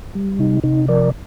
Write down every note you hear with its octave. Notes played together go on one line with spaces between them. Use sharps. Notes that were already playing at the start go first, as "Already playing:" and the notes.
G3
C3 D#4
C3 D#4
F3 A#4 D5